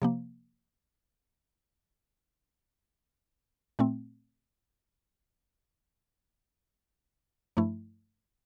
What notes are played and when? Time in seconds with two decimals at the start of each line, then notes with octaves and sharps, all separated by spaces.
0.02 C3 F3 A#3
3.79 A#2 A3 C4
7.57 G2 F3 A3 E4